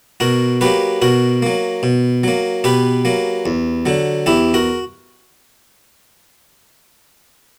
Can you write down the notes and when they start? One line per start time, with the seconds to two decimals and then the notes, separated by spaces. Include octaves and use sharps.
0.20 B2 F#4 A#4
0.61 F#3 A#3 G4 B4
1.02 B2 F#4 A#4
1.42 F#3 A#3
1.83 B2
2.24 F#3 A#3
2.64 B2 G4 B4
3.05 F#3 A#3
3.46 E2
3.86 D3 F#3
4.26 E2 E4 G4
4.54 F#4 A#4